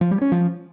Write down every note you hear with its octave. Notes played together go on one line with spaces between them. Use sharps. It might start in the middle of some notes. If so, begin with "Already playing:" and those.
F3
G3
C#4
F3